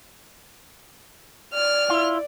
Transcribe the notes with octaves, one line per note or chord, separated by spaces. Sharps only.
D5 F6
E4 F4